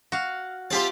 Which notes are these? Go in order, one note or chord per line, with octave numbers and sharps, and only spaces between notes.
F#4 F5
C4 F4 G4 E5 A5